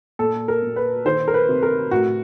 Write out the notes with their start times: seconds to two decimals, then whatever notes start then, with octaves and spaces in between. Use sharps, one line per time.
0.19 A#2 A4
0.48 A#4
0.62 A#2
0.76 B4
1.05 D#3 C5
1.28 A#4
1.34 B4
1.49 C3
1.63 A#4
1.91 A2 F#4